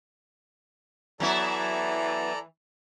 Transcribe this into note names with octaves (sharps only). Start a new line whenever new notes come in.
E3 F#3 B3 E4 A4 D5 A#5